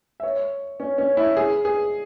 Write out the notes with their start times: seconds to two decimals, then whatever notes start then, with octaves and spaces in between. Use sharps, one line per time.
0.20 E5
0.23 C#5
0.80 C#4
0.98 C#4
1.17 E4
1.37 G#4
1.65 G#4